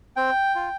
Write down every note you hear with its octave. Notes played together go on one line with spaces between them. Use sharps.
C4 G5
F4